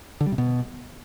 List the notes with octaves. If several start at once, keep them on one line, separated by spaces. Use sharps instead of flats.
D3
G3
C3
B2